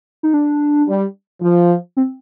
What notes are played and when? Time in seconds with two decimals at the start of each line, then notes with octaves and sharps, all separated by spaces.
0.23 D#4
0.34 D4
0.88 G3
1.41 F3
1.97 C4